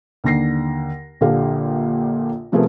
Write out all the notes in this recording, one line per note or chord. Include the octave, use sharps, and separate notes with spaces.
D#2 D3 A#6 C7
A#1 A#2 D3 G4 A4 F5
C3 F3 A3 B3 G#4 A#4